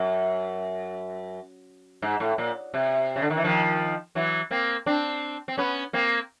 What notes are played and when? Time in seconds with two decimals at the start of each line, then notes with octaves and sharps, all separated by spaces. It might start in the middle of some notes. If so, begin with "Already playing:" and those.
Already playing: F#2
2.02 G#2
2.20 A2
2.38 A#2
2.74 C3
3.16 C#3
3.22 D3
3.30 D#3
3.37 E3
3.44 D#3 F3
4.15 E3 F#3
4.51 A#3 C4
4.86 C4 D4
5.48 C4
5.58 B3 C#4
5.93 A#3 C4